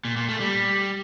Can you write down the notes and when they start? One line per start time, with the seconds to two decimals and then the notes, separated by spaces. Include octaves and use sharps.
0.05 A#2
0.17 A#2
0.29 A3
0.40 G3